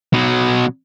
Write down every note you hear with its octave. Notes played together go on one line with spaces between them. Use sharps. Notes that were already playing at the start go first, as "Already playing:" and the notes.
B2 F#3